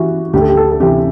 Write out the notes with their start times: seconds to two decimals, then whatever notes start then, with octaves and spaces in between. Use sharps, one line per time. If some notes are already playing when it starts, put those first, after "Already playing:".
Already playing: E3 F#4 G4
0.33 D2 G4
0.41 A4
0.48 G4
0.57 A4
0.71 A4
0.80 C3 E3 G4